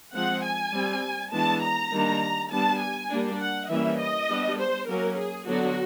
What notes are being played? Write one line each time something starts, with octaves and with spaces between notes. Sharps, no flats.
F3 G#3 C4 F#5
G#5
G3 C4
E3 G#3 B3 D4 A5
A#5
D#3 G3 A#3 D4
G3 B3 D4 A5
G#5
G3 A#3 D4
F#5
E3 G3 A#3 C#4 E5
D#5
G3 B3 D4
C5
F#3 A#3 C#4 A#4
G#4
D3 F#3 B3 D4 F#4